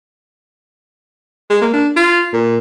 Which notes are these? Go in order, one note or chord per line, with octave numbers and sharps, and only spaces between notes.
G#3
A#3
D4
F4
A#2